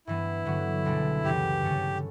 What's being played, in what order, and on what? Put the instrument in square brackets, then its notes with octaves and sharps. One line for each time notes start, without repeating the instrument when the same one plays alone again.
[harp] G2 E3 B3 [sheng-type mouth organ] E4
[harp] G2 D3 F#3 B3 F#4
C#2 B2 G3 D4 A4
[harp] F#2 C#3 E3 [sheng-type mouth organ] G4
[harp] G2 D3 A3 C#4